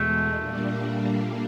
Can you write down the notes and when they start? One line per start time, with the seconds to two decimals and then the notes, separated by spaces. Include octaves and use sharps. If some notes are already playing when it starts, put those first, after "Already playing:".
Already playing: E2 B2 G#3 A3
0.34 A#2 G3 A#3 D4